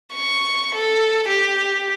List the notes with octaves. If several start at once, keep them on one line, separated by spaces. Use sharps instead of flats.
C#6
A4
G4